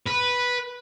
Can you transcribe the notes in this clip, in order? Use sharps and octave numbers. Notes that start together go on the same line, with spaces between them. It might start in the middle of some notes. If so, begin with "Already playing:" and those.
B4